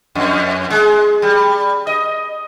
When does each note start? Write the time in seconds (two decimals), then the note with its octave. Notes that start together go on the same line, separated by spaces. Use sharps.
0.15 F2
0.70 G#3
1.22 G3
1.87 D#5